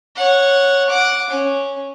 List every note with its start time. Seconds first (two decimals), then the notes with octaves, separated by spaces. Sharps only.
0.16 C#5 F#5
0.89 F#5 D6
1.30 C#4